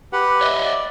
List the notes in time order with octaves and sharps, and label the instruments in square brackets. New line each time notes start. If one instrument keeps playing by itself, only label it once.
[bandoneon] G4 B4 F#5
[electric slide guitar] C#5 D#5 E5
[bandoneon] D5